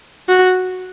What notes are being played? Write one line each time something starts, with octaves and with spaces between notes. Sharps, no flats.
F#4